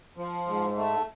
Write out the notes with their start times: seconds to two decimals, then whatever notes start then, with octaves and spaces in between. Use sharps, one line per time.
0.17 F3
0.47 G#2
0.77 A3